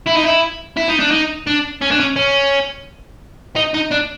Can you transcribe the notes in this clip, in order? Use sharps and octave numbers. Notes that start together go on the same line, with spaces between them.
E4
D#4
E4
E4
D#4
D4
D#4
D4
C#4
D4
C#4
C#4
D#4
D#4
D4